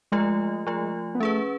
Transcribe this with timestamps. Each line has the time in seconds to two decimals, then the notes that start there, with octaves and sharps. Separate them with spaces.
0.12 F3 G#3 A3 F4
0.67 F3 A3 F4
1.15 B3
1.20 A3 C#4 G#4 B4